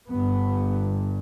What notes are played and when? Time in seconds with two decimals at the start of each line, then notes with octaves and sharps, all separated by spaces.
0.11 G1 G2 B3